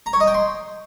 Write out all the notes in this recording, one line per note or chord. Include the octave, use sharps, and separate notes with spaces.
A#5
C#5
D#5
G5
C6